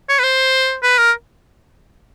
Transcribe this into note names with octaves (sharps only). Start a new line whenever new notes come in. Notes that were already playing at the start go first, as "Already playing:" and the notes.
C#5
B4
C5
B4
A#4